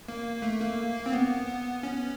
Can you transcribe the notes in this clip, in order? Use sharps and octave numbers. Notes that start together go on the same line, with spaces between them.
A#3
A3
A#3
C4
B3
C#4